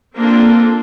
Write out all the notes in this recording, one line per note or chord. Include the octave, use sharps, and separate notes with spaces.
A#3 C4 D4 F4 A4